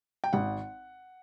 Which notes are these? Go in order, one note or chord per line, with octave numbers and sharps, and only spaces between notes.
G5
G#1 F#5